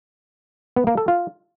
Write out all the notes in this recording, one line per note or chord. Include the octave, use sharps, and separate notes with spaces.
B3
A#3
A4
F4